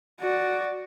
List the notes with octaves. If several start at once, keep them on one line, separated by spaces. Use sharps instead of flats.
F#4 D5